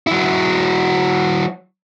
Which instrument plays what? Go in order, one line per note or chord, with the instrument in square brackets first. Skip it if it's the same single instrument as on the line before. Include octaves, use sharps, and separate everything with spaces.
[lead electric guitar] F#3 E4